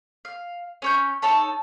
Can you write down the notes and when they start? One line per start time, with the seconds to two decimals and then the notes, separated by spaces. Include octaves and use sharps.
0.25 F5
0.82 C#4 C#5 G6
1.22 D#4 A4 C#5 A5